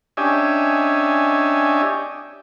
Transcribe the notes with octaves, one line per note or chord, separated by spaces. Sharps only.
C#4 D4 G4 D#5 E5 G#5